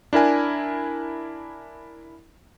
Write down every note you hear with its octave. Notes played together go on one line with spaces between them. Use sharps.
D4 E4 A#4 G#5